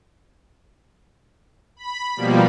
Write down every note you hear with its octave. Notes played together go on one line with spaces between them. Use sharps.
B5
B2 F3 G3 A#3